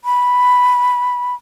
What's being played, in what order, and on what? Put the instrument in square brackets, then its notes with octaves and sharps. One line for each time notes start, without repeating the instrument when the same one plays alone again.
[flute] B5